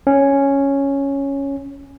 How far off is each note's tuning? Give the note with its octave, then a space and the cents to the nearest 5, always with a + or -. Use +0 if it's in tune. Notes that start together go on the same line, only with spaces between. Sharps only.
C#4 +0